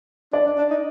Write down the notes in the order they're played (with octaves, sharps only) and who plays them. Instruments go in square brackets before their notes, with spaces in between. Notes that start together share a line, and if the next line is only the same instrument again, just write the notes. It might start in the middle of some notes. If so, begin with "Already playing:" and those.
[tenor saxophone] D4 [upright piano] D5
[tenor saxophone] D4
D4
D#4